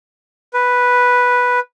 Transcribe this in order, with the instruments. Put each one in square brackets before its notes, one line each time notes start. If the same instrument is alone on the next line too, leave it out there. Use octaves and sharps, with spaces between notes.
[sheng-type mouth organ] B4